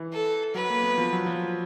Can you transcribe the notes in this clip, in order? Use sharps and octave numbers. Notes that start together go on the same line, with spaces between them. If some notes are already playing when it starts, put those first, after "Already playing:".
Already playing: E3
A4
F#3 B4
A#3
B3
F3
F#3
F3